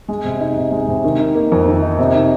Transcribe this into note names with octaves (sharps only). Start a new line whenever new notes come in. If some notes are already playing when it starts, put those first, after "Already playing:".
G#3
C3
D#4
C3
G#3
C3
D#3
D#4
A#3
F2
D#3
D#4
C3
D#4